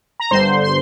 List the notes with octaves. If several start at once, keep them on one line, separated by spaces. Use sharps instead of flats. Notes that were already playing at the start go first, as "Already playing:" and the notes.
A#5
G1 G2 D3 C5 C6
C6